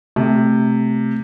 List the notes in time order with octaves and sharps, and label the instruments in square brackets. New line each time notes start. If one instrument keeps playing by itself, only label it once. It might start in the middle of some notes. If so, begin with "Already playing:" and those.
[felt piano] C3 [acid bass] A3